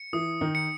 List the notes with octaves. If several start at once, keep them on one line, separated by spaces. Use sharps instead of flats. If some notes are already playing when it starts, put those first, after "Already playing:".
Already playing: C#7
E3 E4 D#6
D#3 D#4
C#7